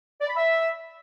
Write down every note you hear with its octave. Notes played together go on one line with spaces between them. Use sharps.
D5
B5
E5